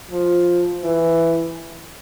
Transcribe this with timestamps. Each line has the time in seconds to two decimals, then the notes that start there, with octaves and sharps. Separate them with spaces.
0.11 F3
0.84 E3